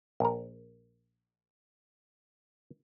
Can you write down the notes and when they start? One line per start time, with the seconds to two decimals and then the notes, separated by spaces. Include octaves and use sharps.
0.20 A#1 A#4